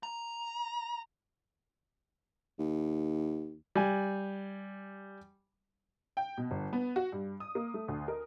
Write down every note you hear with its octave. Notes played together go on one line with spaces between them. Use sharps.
A#5
D#2
G3 G#5
G5
B2
G1
B3
F#4
G2
D#6
A#3
A3
D2
A#4